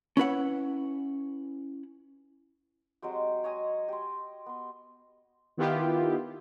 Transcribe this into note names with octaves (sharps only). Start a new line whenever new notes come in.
C#4 E4 B4 F#5
F#3 G#3 C4 G4
C#5 D#5 G#5
G4 C6
B3 C6
D#3 B3 E4 F4 G4